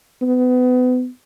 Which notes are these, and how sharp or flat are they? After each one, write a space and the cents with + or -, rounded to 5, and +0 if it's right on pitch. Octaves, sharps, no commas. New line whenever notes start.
B3 +30